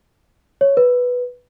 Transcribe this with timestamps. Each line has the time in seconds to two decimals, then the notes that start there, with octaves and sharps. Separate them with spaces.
0.61 C#5
0.77 B4